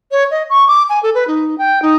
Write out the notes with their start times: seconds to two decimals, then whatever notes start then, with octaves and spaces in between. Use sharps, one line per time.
0.12 C#5
0.31 D#5
0.50 C#6
0.67 D6
0.89 G#5
1.03 A4
1.15 B4
1.27 D#4
1.58 G5
1.82 D#4